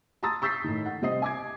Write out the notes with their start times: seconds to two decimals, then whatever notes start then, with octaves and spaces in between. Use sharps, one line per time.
0.23 A5 A#5 C6 D#6 E6 A6
0.42 C#6 E6 G6 A6 B6 C7
0.64 A2 D#3
0.86 F#5
1.02 C3 G3 C4 D#5 D#6 C7
1.22 G#5 D6 G#6